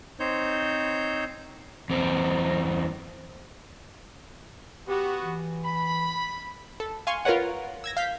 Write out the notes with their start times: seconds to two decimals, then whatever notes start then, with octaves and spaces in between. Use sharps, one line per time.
0.20 C4 D#4 C5 C#5 G6
1.90 E2 C4
4.88 B3 F#4 G4
5.23 E3
5.63 B5
6.80 A4
7.07 F5 G#5 C6 C#6
7.25 F4 A#4 B4 C#5 F#5
7.84 E6 G#6 A#6
7.97 F5 G6 B6